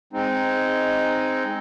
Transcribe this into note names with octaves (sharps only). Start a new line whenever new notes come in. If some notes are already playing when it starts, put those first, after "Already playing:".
G#3 C4 D#4